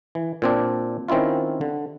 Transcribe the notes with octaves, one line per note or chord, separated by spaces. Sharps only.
E3
A#2 C4 D4
D#3 C4 C#4 E4 F4
D3